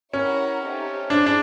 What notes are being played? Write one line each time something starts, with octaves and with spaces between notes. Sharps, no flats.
C#4 E4 G4 A#4 C#5 F#5
A3 C4 D#4 G4
D4 E4 G#4 C5
D4